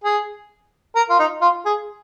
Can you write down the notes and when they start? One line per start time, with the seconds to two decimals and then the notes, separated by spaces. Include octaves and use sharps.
0.04 G#4
0.96 A#4
1.10 F4
1.19 D#4
1.42 F4
1.66 G#4